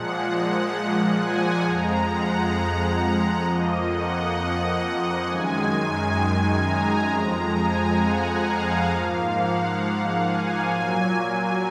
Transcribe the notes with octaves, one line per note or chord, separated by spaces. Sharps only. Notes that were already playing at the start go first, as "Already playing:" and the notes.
Already playing: A#2 F3 G#3 F#5
G#5
F2 F3 G#3 A#5
F#5
F#5
F2 F3 A#3 D#5
F#5
F#5
F#2 D#3 G#3 G#5
A#5
F2 F3 G#3
G#5
F#5
F5
G#2 F3 A#3
F#5
G#5
A#2 F#3 A#3 G#5
G#5